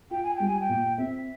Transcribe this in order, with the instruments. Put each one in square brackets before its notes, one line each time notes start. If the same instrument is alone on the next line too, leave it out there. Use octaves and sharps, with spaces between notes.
[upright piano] F4 [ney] G5
[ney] G#5
[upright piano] G3 [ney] G5
[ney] G#5
G5
[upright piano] A#2
[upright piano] C4 [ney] E5